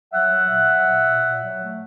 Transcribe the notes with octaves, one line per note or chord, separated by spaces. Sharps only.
F#3 E5 F#5
F#3
A#2
F#3
A#2
A#2
A#2
F#3
A3